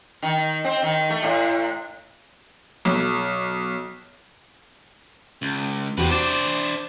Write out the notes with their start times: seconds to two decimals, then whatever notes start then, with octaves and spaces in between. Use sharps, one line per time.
0.23 D#3
0.64 C4
0.83 D#3
1.10 A3
1.23 A2
2.85 B1
5.42 C#2
5.98 E2 C3 F#4 G4 B4
6.11 D4 C5 D6 A6 E7